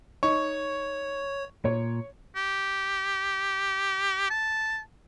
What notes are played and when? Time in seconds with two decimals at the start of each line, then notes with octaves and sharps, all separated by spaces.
0.23 D#4 C#5 C#6
1.65 A#2 C#5
2.36 G4
4.31 A5